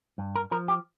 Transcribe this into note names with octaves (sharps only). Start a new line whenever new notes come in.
G2
A#4
F3 A#4
G4